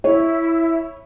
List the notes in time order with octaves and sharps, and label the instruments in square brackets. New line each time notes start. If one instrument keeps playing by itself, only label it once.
[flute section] E4 [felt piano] C#5